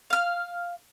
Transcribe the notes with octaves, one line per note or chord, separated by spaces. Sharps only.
F5 F6